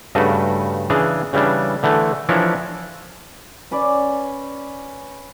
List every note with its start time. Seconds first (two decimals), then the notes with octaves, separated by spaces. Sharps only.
0.15 G2 C#3 A3 F#4 B4
0.90 C#3 E3 D4 G#4
1.33 C#3 E3 G3 C#4 D4
1.83 D3 E3 A3
2.29 E3 F3 D4 E4 A#4 C#5
3.71 C#4 B4 D5